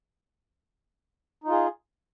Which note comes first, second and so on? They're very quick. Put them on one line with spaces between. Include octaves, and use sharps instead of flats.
D#4 F4 G#4